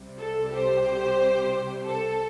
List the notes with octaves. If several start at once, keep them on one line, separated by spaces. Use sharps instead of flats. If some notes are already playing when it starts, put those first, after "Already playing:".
Already playing: C2 C3 G3
A4
G4 C5
A4